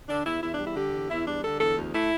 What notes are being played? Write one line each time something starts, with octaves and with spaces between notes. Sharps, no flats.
D3 D4
E2 E4
E2 E4
D4
G3
E4
D3 G4
E2
E2 E4
G3 D4
D3 A4
E2 A4
D2
A3 E4